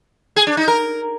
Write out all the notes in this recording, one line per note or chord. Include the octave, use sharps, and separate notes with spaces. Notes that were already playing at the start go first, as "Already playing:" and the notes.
G#4
D4
D#4
A#4